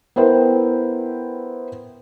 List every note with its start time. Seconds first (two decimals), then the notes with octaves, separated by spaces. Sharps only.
0.16 B3 E4 A#4 C5 G5